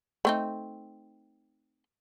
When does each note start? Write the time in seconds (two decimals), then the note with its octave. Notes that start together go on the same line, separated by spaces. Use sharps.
0.25 A3 C4 D#4